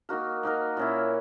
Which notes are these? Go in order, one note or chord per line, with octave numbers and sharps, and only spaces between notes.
A#3 D#4 F#4 A#4
A#3 D#4 F#4 A#4
A#2 A#3 C#4 E4